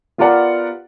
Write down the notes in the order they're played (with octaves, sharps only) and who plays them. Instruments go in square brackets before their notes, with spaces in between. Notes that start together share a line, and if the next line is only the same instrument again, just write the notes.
[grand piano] B3 F4 G4 A#4 D5 F#5